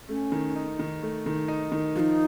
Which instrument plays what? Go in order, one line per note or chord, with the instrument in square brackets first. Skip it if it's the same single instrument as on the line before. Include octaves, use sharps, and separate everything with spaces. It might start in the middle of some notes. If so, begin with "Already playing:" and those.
[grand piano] A3 [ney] C#4
[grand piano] D#3
D#4
D#3
A3
D#3
D#4
D#3
[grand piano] F3 [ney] D#4 F#4